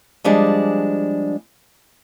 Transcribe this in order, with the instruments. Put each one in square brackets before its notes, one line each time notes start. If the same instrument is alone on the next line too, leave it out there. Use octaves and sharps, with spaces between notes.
[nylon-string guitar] F3 G3 G#3 D4 G#4